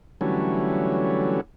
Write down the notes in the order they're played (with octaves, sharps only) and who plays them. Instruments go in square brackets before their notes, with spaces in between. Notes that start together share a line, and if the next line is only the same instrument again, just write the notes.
[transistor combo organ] D3 E3 F#3 G3 A3 C#4